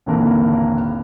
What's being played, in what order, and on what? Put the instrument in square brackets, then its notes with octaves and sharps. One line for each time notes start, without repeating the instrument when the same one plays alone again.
[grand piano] D#1 G#1 D#2 D3 E3 A#4